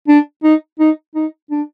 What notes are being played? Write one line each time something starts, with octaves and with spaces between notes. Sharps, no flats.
D4
D#4
D#4
D#4
D4